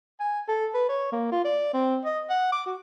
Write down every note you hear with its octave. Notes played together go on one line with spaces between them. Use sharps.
G#5
A4
B4
C#5
A#3
F4
D5
C4
D#5
F#5
D6
F#4